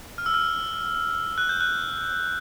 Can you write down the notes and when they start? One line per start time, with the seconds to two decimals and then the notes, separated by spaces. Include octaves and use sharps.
0.18 F6
0.26 E6
0.34 F6
1.38 F#6
1.49 G6
1.61 F#6